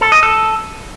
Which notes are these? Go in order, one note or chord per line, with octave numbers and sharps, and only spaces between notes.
A4
D#5
A4